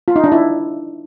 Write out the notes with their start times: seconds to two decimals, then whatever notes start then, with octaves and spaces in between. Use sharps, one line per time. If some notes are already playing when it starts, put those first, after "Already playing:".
0.08 F4
0.16 D#4
0.24 D4
0.32 E4